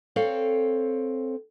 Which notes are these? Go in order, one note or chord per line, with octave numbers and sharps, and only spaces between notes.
C4 A4 C#5 F5